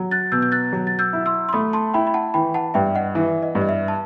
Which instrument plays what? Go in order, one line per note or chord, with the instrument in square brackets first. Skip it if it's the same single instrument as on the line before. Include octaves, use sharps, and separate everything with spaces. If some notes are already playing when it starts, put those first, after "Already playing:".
Already playing: [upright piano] F#3
[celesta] F#6 A6
[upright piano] B2 [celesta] E6 G6
[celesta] G6
F#6 A6
[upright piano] F#3
[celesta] A6
E6 G6
[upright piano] E4
[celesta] C6 E6
C6
[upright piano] A3 [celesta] B5 D#6
[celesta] A5 C6
[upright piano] E4 [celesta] G5 B5
[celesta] B5
F#5 A5
[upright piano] E3 [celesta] G5 B5
[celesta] F#5 A5
[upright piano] G2 [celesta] E5 G5
[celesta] D#5 F#5
[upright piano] E3 [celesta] E5
[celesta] D#5
[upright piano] G2
[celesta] D#5
E5
A5